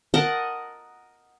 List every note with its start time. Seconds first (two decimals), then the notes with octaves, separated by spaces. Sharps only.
0.14 A#4 D#5 F#5 A5